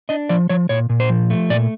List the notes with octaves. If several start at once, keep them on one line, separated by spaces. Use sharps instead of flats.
D4 D#5
F3 D5
F3 C#5
A#2 C#5
A#2
C5
F3
A3
A#2 D5